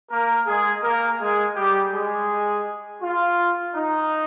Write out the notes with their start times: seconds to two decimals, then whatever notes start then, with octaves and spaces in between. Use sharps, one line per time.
0.10 A#3 A#4
0.46 G#3 G#4
0.83 A#3 A#4
1.20 G#3 G#4
1.56 G3 G4
1.92 G#3 G#4
3.01 F4
3.74 D#4